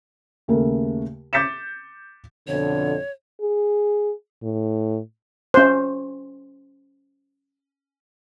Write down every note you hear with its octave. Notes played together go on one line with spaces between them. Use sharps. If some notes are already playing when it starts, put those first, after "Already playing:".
D#2 C#3 A3 A#4
D6 G6 A6 B6 C#7 E7
F2 B2 D3 C#5
G#4
A2
C#4 C5